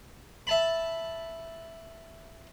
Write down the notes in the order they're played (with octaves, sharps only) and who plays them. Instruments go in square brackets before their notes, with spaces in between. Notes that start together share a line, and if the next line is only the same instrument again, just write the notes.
[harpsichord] E5 A5 B5